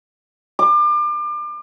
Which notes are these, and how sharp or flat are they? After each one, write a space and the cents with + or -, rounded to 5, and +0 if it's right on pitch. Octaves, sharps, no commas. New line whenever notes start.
D6 +35